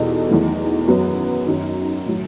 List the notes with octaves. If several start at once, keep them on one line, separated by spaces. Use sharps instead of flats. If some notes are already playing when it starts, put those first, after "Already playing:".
Already playing: E2 B2 G3 D#4 A4
E2 D#3 F#3 A3
F#2 F#3 B3
F#2 D#3 F#3
A2 F#3